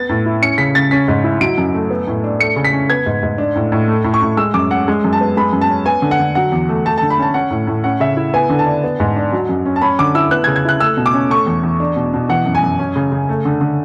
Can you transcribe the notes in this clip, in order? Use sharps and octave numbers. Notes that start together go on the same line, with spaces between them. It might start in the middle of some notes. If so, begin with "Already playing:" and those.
Already playing: B3 A6
A2
E4
C#4 C#7
C#3 B6
C#3 A6
C#4 B6
G#2
E4
F#3 D7
F#2
A3
B3
A2
D4
A3 C#7
C#3
B6
C#4
B3 G#6
G#2
G#2
D4
A2
A2
A3
A2
C#6
A2
G#3 E6
F#2 D6
C#4 F#5
G#3
F#2
A5
B3
G#3 B5
F#2
A5
C#4
B3 G#5
D3
F#5
D3
F#3 F#5
E2
A3
A3 A5
A5
D3
B5
C#4 A5
C#4 F#5
A2
A2
C#4 F#5
C#3 E5
E4
B3 G#5
D3
A5
D4
B3
G#2
D4
F#3
F#2
C#4
A5
C#4 B5
D3 D6
E4 E6
B3 F#6
G#6
C#3
G#6
E4 F#6
A3 E6
B2
D6
C#4
A3 C#6
E2
E2
D4
B2
B2
E3 F#5
F#2
G#5
F#2
C#4
C#3
C#3
A3
D3
D3